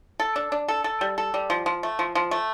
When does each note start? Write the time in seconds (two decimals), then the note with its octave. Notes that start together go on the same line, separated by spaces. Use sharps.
0.20 A4
0.36 D4
0.52 D4
0.68 A4
0.84 A4
1.01 G3
1.18 A4
1.34 G3
1.50 F3
1.66 F3
1.83 A3
1.99 F3
2.15 F3
2.31 A3